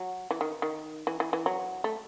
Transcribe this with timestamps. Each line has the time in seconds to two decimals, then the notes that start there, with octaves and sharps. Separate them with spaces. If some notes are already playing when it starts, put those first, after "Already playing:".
Already playing: F#3
0.31 E3
0.41 D#3
0.62 D#3
1.07 E3
1.20 E3
1.33 E3
1.46 F#3
1.84 A3